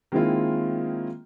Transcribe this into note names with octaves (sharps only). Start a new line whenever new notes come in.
D#3 G#3 A#3 C4 E4 F4